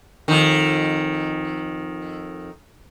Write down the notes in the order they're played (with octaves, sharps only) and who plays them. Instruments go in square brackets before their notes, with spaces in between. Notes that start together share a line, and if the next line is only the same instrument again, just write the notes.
[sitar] F2 D#3